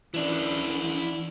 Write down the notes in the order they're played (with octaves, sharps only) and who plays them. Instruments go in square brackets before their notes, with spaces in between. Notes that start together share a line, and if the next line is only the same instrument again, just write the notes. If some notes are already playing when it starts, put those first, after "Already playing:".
[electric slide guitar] E3 D4 [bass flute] C#4 [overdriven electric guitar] E4 D5